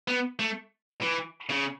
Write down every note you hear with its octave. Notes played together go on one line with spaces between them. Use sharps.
B3
A3
E3
C#3